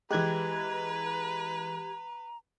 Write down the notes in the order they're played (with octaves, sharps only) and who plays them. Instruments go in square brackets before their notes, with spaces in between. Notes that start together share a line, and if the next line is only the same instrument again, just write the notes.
[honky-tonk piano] E3 G#3 [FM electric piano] G4 F#6 G#6 [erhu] B4 [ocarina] A#5